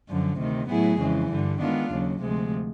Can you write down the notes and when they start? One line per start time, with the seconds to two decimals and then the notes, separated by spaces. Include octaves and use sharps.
0.09 F#2 D3 F3
0.39 D2 C3 D#3
0.69 A2 F#3 B3 E4 G#4
1.00 F2 C#3 E3 G#3
1.30 G2 D3 G3
1.60 D#3 G#3 B3 D4 F4
1.91 D#2 C#3 F#3
2.22 D2 C3 F3 G#3